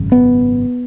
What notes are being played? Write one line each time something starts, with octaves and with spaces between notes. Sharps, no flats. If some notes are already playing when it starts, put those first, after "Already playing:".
Already playing: G#1 F#2 C#3
B3